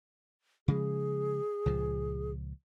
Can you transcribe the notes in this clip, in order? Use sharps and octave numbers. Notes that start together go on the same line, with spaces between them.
C#3 F3 G#3 G#4
C#2 A#2 F3